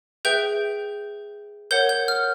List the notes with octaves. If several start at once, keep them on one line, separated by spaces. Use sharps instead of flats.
G#4 B4 E5 G5 G6
A#4 C#5 F#5 G6
G6
F6